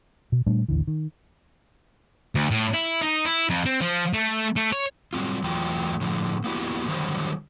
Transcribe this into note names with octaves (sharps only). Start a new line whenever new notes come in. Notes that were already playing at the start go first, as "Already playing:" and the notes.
B2
A#2 G3 A3 D4
A1 D#2 D3 E3
D#3
D2
A2
E4
D#4
E4
F2
C4
F3
A3
A3
C#5
F#3 G3 C4 F4
E2 E3 F#3 A3 F4 G5
A2 D3 F3
A#3 B3 E4 F#4 G4
D3 D#3 F#3 G3 C5